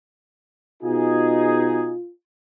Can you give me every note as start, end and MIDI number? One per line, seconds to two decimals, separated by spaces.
0.83 1.94 47
0.83 1.94 63
0.83 2.10 65
0.83 1.94 68